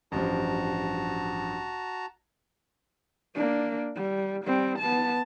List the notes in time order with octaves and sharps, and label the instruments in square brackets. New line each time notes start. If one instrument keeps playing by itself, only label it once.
[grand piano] A1 G2 F3 [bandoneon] F#4 A5 A#5
[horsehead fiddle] A#3 D4
G3
G3 C4
B3 A5